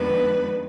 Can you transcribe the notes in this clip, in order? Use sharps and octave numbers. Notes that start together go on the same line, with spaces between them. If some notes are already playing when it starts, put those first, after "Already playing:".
Already playing: F2 D#3 G#3 B3 D4 B4